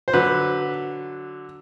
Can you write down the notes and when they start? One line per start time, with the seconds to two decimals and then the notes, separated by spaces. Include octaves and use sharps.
0.08 C5
0.13 D3 F#3 B4